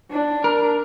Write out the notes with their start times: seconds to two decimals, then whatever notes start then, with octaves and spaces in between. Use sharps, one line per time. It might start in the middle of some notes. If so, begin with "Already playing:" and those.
0.11 D4
0.44 A#4